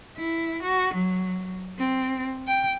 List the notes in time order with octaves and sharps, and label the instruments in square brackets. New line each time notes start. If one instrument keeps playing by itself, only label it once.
[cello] E4
F#4
F#3
C4
G5